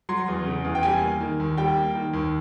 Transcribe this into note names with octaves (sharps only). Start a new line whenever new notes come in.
F#3 C6
E2
C#3
E2
G5
G3 G#5
A#3
D#3
D#2
G3 G5
A#3
D#3
D#2